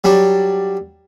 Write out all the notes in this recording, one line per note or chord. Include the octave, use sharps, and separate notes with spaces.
F#3 G3 D4